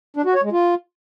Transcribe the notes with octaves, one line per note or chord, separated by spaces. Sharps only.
D4
F#4
C#5
G#3
F4